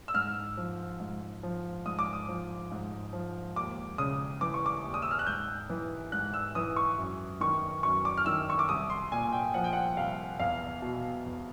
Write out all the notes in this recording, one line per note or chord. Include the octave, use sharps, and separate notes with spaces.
E6
G#2 F6
F3
G#2
F3
G#2 D#6
D6
D#6
F3
G#2
F3
D#2 D6
C#3 D#6
E3 D6
C#6
D6
D#2
D#6
E6
F6
F#6
G#2 G6
E3
G#2 F#6
E6
E3 D#6
C#6
F#2
D#3 C#6
F#2 C#6
D6
F6
D#3 E6
C#6
D6
C2 D#6
C6
A#2 G#5
G5
F3 F#5
G5
F#5
C2 F5
E2 F5
B2
E2